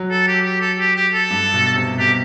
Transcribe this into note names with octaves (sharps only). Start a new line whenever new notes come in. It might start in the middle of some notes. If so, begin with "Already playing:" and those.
Already playing: F#3
A4
G4
G4
A4
G4
G4
A4
G2
B2
C3
B2 G4